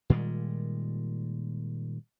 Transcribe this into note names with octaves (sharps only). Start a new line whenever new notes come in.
A#2 D#3 G3 G#3